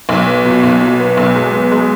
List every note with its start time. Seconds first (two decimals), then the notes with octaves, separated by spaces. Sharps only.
0.09 B1
0.27 B3
0.45 B2
0.63 B1
0.81 B2
0.99 B3
1.17 B1
1.35 G#3
1.53 B3
1.72 G#3